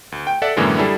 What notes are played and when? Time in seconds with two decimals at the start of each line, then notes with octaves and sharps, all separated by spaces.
0.12 D2
0.27 G5
0.42 A4 D5 E5 F#5
0.57 F#2 A2 D3 E3 G#3 A#3
0.78 G3 D4 E4 G#4 A4